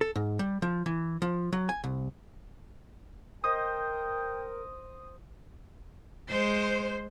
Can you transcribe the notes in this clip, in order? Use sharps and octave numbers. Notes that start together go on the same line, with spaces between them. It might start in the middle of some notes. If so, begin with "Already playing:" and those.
A4
G#2
G3
F3
E3
F3
F#3
G#5
C2
A#4 C5 D#5 G5 D#6
G#3 C5